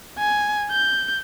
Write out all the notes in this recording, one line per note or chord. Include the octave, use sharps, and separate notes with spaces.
G#5
G6